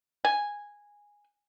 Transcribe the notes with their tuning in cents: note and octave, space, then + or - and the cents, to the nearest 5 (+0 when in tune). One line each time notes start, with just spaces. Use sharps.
G#5 -10